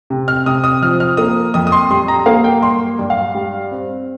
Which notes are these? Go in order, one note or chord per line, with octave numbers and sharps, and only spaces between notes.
C3
F6
C3 D#6
D#6
F3 F6
F6
A#3 D#6
F2 D#6
D#6
C6
G3 C6
A#5
A#3 F5
G5
G2 C6
G2
F5
G3
C4